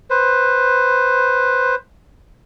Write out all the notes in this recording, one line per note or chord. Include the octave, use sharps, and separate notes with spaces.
B4 C5